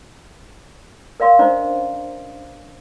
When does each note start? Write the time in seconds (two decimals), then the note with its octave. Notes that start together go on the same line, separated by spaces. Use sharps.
1.20 A#4 D5 F5 C6
1.39 C#4 D4 C5 D5 D#5 A#5